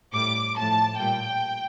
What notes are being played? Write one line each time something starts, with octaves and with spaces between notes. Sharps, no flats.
A2 G3 D6
A2 F3 A5
A#2 G3 G5